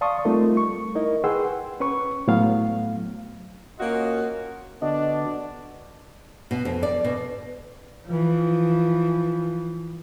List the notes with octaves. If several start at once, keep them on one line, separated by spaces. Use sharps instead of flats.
D5 F5 A5 C6 C#6 D#6
G3 A3 C4 D#4 F4 A#4
C#6
D#4 E4 A#4 D#5
G#4 B4 F#5 G5 C6 E6
C#4 B4 C#6
A2 F#3 B3 F5
A#3 C#4 F4 F#4 D#5
D3 B3 D4 F#4 D#5
B2
F2
D5
B2
E3 F3